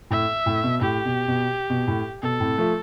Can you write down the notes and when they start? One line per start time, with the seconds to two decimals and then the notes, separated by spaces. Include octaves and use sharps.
0.11 A2 E5
0.46 A2
0.63 B2
0.81 A2 G4
1.05 B2
1.28 B2
1.70 B2
1.87 A2
2.22 B2 A4
2.40 A2 C3
2.58 F3 A3